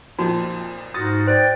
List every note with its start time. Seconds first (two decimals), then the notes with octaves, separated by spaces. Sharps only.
0.19 F2 A#2 F3 D#4 F#4
0.94 G#2 D#4 F4 F#4 D#6 A6
1.27 C5 D5 G5